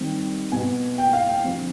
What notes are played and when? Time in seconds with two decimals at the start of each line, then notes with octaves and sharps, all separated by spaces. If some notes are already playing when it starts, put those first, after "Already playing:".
Already playing: D#3 G3 C4
0.52 B2 B3 G#5
0.98 G5
1.13 F5
1.29 G5
1.44 D3 F3 C4